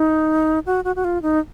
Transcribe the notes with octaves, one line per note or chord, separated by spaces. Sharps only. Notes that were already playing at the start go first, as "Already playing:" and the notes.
Already playing: D#4
F#4
F#4
F#4
F4
D#4